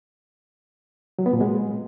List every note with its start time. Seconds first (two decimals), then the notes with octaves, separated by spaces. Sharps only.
1.19 F#3
1.26 B3
1.33 A#2
1.41 G#3